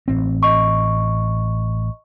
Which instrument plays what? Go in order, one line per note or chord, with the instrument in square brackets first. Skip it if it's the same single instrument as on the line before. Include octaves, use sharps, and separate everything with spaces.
[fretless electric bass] A1 C4
[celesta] D#5 C#6